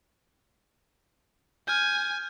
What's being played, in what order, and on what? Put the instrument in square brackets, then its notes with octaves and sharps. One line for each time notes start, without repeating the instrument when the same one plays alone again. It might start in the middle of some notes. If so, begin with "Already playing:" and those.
[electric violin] G#5 [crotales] F6 G6